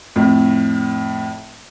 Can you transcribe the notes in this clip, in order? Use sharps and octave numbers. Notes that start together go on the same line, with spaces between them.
F2 A2